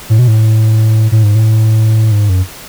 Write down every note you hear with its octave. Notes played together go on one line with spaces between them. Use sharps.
A2
B2
A2
A2
G#2
A2
G#2
F#2